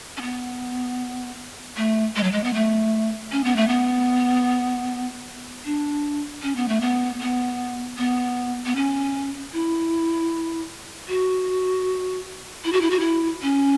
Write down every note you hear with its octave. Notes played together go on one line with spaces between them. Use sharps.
C#4
B3
A3
G#3
F#3
G#3
B3
A3
C#4
B3
A3
B3
D4
C#4
B3
A3
B3
B3
B3
B3
C#4
E4
F#4
E4
F#4
E4
F#4
E4
C#4